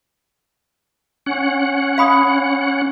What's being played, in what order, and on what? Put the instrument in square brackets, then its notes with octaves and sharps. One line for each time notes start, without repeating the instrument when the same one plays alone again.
[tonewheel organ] C#4 F#5
[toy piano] F5 B5 D#6